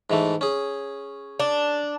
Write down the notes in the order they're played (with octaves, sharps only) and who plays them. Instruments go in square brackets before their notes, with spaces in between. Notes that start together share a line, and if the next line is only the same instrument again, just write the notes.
[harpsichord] G#2 E3 A3
C#4 G#4
[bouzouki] D4